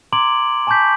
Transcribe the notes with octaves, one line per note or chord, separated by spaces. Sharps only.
A#5 C6 D6 G#6 D7 F#7
G#5 A5 C#6 D6 G6 B6